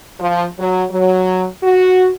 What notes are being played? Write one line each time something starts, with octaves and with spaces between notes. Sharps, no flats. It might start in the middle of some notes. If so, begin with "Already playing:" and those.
F3
F#3
F#3
F#4